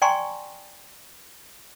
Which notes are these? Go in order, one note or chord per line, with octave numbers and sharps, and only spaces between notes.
D5 G5 G#5 A#5 C6 C#6